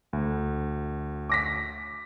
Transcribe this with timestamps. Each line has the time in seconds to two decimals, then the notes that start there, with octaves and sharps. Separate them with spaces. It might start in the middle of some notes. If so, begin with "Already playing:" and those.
0.13 D2
1.29 D6 A#6 B6